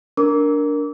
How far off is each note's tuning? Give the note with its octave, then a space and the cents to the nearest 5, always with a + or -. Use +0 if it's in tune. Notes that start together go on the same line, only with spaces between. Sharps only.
D4 -10 A#4 +0 D6 -30